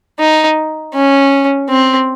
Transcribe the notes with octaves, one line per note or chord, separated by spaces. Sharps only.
D#4
C#4
C4